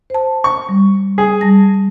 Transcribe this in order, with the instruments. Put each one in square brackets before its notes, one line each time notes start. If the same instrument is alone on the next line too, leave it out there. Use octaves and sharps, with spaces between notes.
[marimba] C5 A5
[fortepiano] C#6
[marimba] G3
[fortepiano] G#4
[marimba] G3 A5 A#6